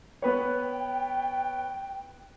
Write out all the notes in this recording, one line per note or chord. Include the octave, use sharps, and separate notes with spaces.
B3 B4 C#5 G5